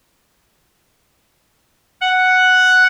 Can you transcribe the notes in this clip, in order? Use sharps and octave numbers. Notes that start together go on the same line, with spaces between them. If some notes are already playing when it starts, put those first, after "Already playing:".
F#5